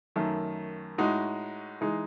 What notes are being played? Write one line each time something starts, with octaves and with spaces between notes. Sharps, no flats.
F#2 D#3 A3
A2 G#3 D#4 F#4
E3 G#3 D#4 G#4